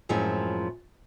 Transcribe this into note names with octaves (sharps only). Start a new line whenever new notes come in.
F#2 A2 F3 G#3 C4 E4